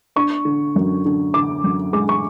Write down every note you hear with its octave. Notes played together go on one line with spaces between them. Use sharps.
D4 C#6
D3
F#2
D3
D3 D6
F#2
G#3 D6
C#6